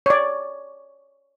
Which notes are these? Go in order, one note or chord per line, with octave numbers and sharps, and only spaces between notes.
C#5 D5